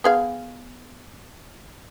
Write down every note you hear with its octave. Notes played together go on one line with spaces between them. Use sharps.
B3 G#4 F5